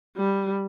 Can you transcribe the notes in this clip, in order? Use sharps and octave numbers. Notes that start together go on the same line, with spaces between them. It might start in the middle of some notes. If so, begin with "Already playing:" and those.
G3